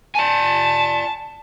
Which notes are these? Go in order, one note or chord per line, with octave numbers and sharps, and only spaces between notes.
D5 G#5 A5